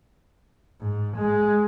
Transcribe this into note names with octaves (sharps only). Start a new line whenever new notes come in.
G#2
G#3